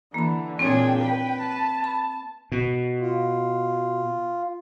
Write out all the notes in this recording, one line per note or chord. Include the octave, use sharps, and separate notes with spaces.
D3 E3 A#3 B5
A#2 C4 D4 G#4 C#5 G5
B4
A5
B5
B2
F4